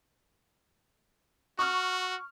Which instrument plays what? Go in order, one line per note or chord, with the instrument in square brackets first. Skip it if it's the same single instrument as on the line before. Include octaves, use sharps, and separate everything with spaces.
[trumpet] F#4 [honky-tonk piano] C#6 F6